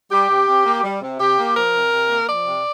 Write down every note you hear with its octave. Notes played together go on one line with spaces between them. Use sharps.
G3 G4
C3
C3
A#3
G3
C3
C3 G4
A#3
F3 A#4
C3
C3
A#3
F3 D5
C3